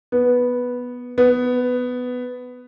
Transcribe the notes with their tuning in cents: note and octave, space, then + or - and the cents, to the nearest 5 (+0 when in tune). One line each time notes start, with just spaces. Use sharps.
B3 -5
B3 +10